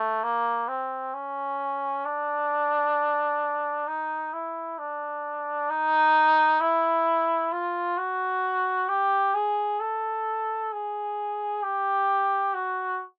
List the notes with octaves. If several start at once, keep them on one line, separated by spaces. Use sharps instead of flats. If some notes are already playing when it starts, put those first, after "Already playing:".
Already playing: A3
A#3
C4
C#4
D4
D#4
E4
D4
D#4
E4
F4
F#4
G4
G#4
A4
G#4
G4
F#4